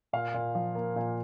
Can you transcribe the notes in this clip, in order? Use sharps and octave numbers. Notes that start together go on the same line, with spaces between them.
A#2 F5
A#2
F3
A#3
A#2